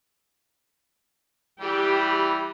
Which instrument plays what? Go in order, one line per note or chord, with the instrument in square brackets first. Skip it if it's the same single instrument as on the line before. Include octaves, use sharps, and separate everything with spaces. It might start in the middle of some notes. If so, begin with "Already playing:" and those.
[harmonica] E3 G3 E4 [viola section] G4